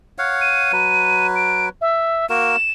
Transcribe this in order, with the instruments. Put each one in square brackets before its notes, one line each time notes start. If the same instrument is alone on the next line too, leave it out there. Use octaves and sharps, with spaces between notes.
[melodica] C#5 F5 F#5
[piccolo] D#7
[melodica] F#3 B4
[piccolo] D7
E5
[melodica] A#3 F#4 A#4 [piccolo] E7